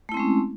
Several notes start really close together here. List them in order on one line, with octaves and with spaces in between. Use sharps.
A3 E4 C4 G#3 C#4